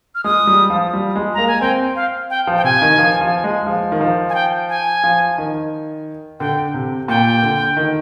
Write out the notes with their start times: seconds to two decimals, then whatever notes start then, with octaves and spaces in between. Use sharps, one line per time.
0.15 F6
0.24 G#3 D#6
0.47 G3
0.70 F3
0.93 G3
1.16 G#3
1.34 A#3 A#5
1.48 G#5
1.61 C4 G5
1.96 F5
2.30 G5
2.47 F3
2.58 G5
2.64 C3 G#5
2.82 D#3
2.98 F3
3.21 F3
3.44 G#3
3.66 F3
3.92 D#3
4.01 F3
4.29 G#5
4.35 G5
4.69 G#5
5.03 F3
5.38 D#3
6.40 D3 G5
6.74 C3
7.08 A#2 G5
7.43 D3
7.77 D#3